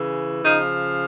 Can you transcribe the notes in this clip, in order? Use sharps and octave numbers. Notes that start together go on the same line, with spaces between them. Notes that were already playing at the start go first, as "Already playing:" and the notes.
Already playing: C#3 E3
C#3 F3 D#4